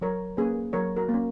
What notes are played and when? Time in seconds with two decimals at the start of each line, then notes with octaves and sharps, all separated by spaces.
0.01 F#3 A#4 C#5
0.37 A#3 C#4 G#4 B4
0.73 F#3 A#4 C#5
0.96 F#4 A#4
1.09 A#3
1.14 C#4